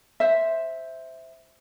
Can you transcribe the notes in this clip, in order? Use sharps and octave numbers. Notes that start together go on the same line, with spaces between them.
C5 E5